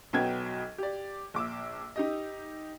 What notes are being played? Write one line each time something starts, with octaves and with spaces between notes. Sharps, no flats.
B1 F#3 B3 G5 G#6
G4 D5
A#1 D6 E6
D#4 G4 D#5